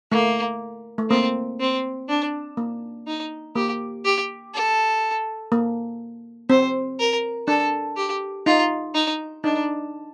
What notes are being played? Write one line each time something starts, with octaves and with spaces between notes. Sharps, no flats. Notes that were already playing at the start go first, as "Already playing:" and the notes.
A3 A#3
A3
A#3 C4
C4
D4
A#3
D#4
A#3 G4
G4
A4
A#3
C4 C5
A#4
D4 A4
G4
D#4 F4
D#4
D4 D#4